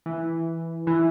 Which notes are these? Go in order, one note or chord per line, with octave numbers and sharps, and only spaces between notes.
E3
E3